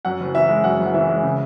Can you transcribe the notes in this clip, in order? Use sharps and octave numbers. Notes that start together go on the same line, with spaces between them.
F#2 F#5
F#1
E3 E5
G#3
F#2 F#5
F#1
F#5
E3 E5
G#3
C#3